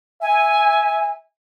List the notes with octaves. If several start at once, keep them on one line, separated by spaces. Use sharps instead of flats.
E5 G#5